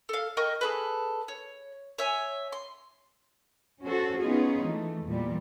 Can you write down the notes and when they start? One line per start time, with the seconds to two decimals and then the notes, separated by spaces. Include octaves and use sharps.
0.09 A4 F5
0.37 A#4 D#5 G5 C#6
0.61 G#4 A4 B4
1.28 C#5
1.98 C#5 E5 G#5
2.52 C6
3.82 C#4 F#4 A4 C5
4.18 B3 C#4 D#4 F4 G#4
4.67 E3 A3
5.05 E2 A#2 G3